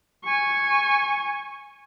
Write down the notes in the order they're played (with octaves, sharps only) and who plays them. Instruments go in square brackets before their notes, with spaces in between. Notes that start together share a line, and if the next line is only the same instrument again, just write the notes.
[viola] G#5 C#6